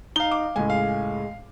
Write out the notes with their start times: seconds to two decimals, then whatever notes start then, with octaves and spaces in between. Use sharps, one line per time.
0.16 D#4 F5 G7
0.31 D6
0.56 C#2 A2 G#3 G#5
0.70 F5